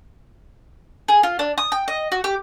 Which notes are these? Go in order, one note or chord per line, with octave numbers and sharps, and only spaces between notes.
G#4
F4
D4
D#6
G5
D#5
F#4
G4